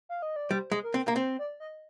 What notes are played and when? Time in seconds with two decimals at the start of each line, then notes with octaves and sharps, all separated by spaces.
0.09 F5
0.22 D#5
0.36 D5
0.50 G3 C5
0.72 G#3
0.83 A#4
0.94 C4
1.08 A#3
1.16 C4 C5
1.39 D5
1.60 D#5